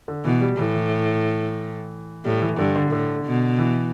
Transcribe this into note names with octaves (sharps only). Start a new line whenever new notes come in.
D3
B2 E3
G3
A2 E3
E3
A2 G3
E3
G2 D3
D3
A2 D3
B2
E3